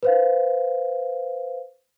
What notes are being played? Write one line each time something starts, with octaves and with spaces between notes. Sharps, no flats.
B4 C5 F5